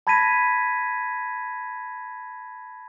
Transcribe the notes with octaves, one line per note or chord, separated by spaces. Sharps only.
A5 B5 G#6 A#6 B6 D#7